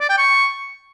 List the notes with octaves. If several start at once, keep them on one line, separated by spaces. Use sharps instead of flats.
D5
G5
C#6